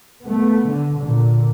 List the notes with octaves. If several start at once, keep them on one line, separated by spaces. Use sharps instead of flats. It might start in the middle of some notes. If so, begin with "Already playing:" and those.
A3 B3
D3
A#2 D3